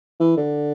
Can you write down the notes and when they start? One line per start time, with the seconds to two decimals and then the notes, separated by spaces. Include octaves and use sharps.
0.20 E3
0.37 D3